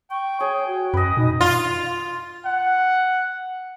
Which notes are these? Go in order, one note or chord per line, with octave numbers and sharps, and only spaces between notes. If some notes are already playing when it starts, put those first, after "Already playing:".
G5 C#6
G#4 C#5
F#4
F#2 B4 D#5
B2 D#4
F4
F#5